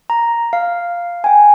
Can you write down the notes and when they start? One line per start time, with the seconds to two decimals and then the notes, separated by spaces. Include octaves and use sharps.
0.10 A#5
0.53 F5
1.24 G5 G#5